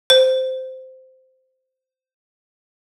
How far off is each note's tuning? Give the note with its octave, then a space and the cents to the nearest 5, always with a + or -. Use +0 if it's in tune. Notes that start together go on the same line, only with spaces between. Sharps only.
C5 -10